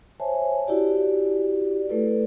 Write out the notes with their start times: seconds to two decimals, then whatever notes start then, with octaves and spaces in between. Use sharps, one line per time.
0.20 C5 C#5 E5 G#5 A5
0.67 E4 F#4 G4 D5
1.89 A3 E4 A4 B4 D5